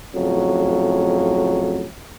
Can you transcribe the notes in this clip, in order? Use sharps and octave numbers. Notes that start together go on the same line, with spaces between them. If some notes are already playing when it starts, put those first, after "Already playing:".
F2 A2 C#3 F#3